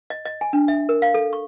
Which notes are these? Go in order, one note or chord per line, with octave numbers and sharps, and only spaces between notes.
D#5
D#5
G#5
D4
E5
A#4
F5
A4
C#6